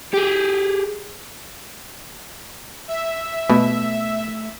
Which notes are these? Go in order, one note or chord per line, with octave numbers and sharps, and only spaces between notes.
G4 G#4
E5
B2 A3